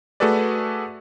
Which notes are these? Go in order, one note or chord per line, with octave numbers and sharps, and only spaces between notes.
A3 F#4 G#4 A4 B4 D5